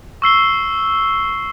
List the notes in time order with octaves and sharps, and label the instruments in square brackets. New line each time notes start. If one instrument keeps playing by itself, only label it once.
[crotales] C#6 E6 C7 G7